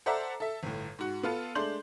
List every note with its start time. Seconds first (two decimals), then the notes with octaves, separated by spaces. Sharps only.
0.06 A4 C5 D5 E5 F#5 A#5
0.40 A4 E5
0.63 G1 A2
0.99 G#2 F#4
1.23 B3 F4 A4
1.55 G#3 A3 D4 C6 G6 F#7